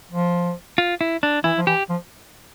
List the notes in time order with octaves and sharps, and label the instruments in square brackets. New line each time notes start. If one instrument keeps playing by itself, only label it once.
[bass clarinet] F3
[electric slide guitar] F4
E4
D4
[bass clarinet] E3 [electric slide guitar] E4
[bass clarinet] F3
[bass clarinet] E3 [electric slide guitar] G4
[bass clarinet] F3